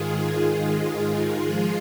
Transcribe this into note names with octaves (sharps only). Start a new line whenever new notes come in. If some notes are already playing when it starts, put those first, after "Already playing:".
Already playing: G#2 D#3 G#3 F4 G#4
F3 G#3 F4 G#4